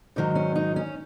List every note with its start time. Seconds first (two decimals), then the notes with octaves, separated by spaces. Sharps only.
0.16 G#2 D#3 F#3 D#4
0.35 C#4
0.56 D#4
0.76 C#4